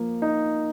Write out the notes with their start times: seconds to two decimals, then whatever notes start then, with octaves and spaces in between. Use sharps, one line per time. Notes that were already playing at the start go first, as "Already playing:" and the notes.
Already playing: F3 A#3
0.22 D#4